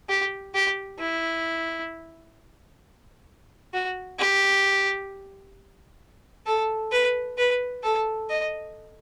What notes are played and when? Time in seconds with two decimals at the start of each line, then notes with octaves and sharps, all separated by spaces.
0.09 G4
0.54 G4
0.99 E4
3.73 F#4
4.19 G4
6.46 A4
6.92 B4
7.38 B4
7.83 A4
8.29 D#5